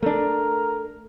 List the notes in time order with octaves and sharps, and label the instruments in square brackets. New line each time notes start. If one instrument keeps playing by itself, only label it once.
[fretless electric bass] A3 D4 [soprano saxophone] A#4